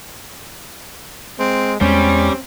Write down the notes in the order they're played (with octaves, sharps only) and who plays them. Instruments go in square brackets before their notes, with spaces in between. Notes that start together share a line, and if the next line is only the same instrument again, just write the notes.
[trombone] G#3 [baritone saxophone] C4
[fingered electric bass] E2 G#3 [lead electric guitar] G3 [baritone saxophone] C4 [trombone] C#4